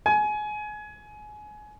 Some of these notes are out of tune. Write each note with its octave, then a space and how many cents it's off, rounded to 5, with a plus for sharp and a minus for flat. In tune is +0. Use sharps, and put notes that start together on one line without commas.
G#5 +25